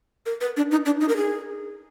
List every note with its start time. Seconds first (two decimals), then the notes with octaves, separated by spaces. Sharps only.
0.26 A#4
0.41 B4
0.57 D4
0.71 D#4
0.86 D4
1.00 D#4
1.09 A#4
1.17 G#4